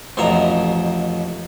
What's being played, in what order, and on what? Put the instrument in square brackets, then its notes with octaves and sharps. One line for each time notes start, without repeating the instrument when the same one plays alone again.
[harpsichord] A1 F2 B2 E5 A#5